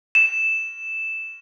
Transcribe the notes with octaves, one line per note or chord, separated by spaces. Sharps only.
E7